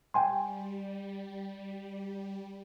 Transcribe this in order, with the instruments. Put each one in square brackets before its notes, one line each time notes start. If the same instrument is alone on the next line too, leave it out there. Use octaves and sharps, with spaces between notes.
[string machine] G3 [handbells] G5 G#5 C6